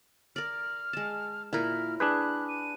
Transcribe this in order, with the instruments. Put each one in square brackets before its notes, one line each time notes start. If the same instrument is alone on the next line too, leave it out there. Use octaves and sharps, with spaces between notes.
[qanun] A#4 D5 [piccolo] F6
[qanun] G#3 A5
[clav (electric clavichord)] A#2 [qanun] E4 A#4 [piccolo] F6
[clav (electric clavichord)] D4 G#4 B4 [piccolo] F#6
[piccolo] D#7